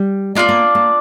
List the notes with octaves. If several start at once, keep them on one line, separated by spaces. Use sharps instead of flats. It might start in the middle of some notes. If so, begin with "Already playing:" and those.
Already playing: G3
A#3 D4 F4 D5
A#3
A#3